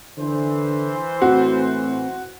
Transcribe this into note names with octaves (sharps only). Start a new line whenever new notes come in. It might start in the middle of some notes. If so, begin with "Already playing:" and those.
D3 E3 C5
A2 C4 F#4